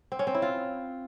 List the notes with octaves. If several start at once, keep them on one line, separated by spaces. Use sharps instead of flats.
C4
C#4
C4
E4
F4